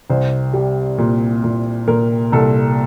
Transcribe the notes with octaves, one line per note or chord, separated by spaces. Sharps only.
C2 C5
G3
A#2
A#2
A#2 A#4
C2 A4